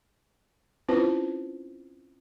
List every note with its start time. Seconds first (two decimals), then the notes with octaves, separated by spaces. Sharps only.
0.89 C4 C#4 E4 F4 B4 C5